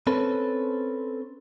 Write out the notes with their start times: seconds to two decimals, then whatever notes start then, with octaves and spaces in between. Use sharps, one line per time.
0.07 C4 C#4 A4 B4